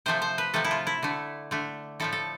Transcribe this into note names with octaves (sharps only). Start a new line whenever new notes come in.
C3 F3 A3 C5
C5
B4
C3 F3 A3 A4
E4
F4
E4
D3 A3
D3 A3
A2 F3 A3 A4
A4